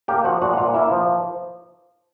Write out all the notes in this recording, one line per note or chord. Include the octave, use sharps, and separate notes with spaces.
A#3 G4 G5
F3 F#4 F#5
A#2 F#4 F#5
F#5
A#2 F4 F5
A#3 E4 E5
F3